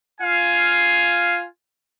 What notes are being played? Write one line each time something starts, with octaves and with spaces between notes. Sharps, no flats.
F4 F5 G#5